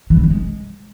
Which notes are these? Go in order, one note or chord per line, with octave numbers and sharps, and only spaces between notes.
E3
C3
G3
G#3